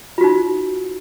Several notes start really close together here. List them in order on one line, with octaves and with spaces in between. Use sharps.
F4 F#4 D#4